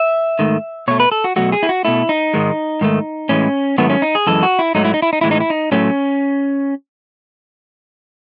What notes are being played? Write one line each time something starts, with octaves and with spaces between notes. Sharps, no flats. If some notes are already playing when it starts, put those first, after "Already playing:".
Already playing: E5
G#2 D#3 A3
B2 A3 C#5
B4
A4
F#4
B2 F#3 A3 F#4
G#4
E4
F#4
B2 A3 E4
D#4
G#2 D#3 G#3
G#2 D#3 A3
A2 E3 G#3 C#4
G#2 D#3 F#3 A3 B3
C#4
D#4
G#4
F#2 E3 G#3 A4
F#4
E4
G#2 F#3 A3 D#4
E4
D#4
E4
D#4
A2 E3 G#3 E4
D#4
E4
D#4
A2 F#3 A3 C#4